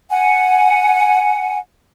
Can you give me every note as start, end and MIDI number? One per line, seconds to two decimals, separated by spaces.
0.11 1.58 78
0.11 1.58 80